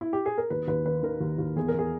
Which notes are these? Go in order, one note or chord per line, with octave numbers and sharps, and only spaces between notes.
E4
G4
G#4
A#4
D#2 B4
D#2 B4
D#3 B4
D#3 A#4
D#2
D#2
E2 G#4
A#4
E2 G#4